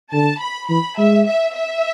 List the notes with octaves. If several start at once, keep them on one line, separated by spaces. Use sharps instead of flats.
D3 A5
B5
E3 B5
G#3 E5
E5
E5